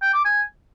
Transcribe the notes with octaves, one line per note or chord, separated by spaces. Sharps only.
G5
D6
G#5